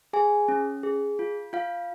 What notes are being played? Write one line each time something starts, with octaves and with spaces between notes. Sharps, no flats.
G#4 G#5
C#4
G#4
F4
F4 F5